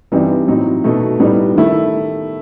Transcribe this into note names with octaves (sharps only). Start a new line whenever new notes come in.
G2 E3 G3 C4 D#4
A2 F#3 C4 D#4
B2 A3 D#4
A2 G3 B3 D#4
D#3 A3 E4